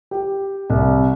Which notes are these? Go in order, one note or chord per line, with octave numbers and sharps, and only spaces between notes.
G4
C2